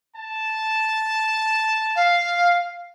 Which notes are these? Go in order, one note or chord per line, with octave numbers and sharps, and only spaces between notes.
A5
F5